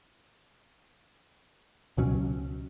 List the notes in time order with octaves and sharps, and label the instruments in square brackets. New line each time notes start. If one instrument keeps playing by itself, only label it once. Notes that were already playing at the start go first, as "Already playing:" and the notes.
[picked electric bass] C#2 B2 F#3 C#4